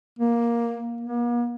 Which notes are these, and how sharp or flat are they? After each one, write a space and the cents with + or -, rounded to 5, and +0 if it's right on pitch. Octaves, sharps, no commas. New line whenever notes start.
A#3 +10
A#3 +45